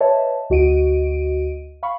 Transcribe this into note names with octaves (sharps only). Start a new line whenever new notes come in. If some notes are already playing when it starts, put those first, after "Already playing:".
B4 C#5 D#5 E5 A5
D2 F#4 D#5 D7 D#7
F5 B5 C#6